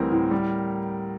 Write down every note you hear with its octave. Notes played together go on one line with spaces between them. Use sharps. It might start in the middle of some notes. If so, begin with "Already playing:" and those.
Already playing: D2 E3 G3 C4 A#4
A2
G3